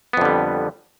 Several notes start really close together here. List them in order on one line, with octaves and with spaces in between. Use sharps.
B3 F2 D3 G3